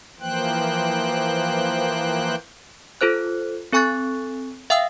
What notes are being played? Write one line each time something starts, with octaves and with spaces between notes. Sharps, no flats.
E3 F3 A#3 C5 G5 F#6
F4 A4 C5 F#6
C4 A4 G#5 C#6 F#6 A6
E5 F5 G5 D#6 E6